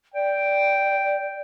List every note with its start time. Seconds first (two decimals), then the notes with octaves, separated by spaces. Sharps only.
0.14 D5 G5